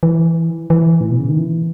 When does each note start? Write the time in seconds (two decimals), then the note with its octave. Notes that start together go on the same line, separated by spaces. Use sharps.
0.03 E3
0.70 E3
1.01 A2
1.10 B2
1.19 C#3
1.29 D#3
1.39 E3